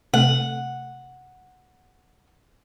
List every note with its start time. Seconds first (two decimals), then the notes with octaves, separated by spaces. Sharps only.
0.14 C3 A3 F#5